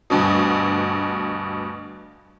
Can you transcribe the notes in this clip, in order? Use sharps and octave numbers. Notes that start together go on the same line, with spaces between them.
D2 G2 B2